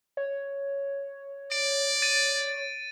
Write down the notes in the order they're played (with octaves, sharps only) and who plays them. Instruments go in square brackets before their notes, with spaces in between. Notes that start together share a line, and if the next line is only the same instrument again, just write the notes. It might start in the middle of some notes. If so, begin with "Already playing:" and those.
[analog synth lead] C#5
[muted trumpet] D5 [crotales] D7
[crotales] A6 D#7